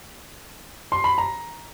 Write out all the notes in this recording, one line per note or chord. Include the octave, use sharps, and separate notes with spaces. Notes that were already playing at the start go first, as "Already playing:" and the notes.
C6
B5
A#5